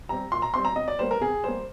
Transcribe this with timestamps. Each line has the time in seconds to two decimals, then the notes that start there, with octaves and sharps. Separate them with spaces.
0.09 G3 C4 A#5
0.32 A#2 C6
0.42 A#5
0.54 G3 C4 C6
0.65 A#5
0.76 C3 D#5
0.88 D5
0.99 G3 A#3 C5
1.11 A#4
1.21 C3 G#4
1.44 G3 A#3 C5